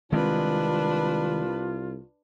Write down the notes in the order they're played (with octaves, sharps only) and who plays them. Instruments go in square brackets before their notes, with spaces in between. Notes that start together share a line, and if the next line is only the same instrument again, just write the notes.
[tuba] C2 [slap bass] D#3 G#3 C4 [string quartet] D4 B4 [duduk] F4